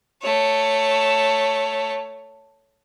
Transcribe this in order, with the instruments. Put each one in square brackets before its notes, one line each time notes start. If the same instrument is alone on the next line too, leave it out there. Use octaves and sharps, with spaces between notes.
[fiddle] A3 C#5